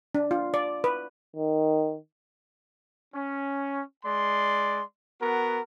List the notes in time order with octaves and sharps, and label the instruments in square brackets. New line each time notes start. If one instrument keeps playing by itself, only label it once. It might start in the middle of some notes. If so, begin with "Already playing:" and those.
[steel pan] D4
F4
D5
B4
[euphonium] D#3
[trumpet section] C#4
G#3 D5 C6
B3 F#4 A#4